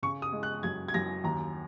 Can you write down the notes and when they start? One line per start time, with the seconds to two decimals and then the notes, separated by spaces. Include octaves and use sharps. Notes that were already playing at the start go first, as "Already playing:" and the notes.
0.03 C#3 C#6
0.22 D#6
0.32 G#3
0.43 F#6
0.63 F#2 G#6
0.88 G#6
0.94 F#2 A#6
1.24 D#2 A#5